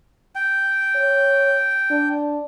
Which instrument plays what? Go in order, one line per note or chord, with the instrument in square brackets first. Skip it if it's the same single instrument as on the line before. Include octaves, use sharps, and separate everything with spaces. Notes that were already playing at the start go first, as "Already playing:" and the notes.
[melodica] G5
[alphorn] C#5
D4